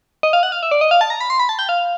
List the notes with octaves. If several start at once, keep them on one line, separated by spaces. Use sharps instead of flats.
D#5
F5
F#5
F5
E5
D5
D#5
F5
A5
A#5
B5
C6
B5
A5
G5
F5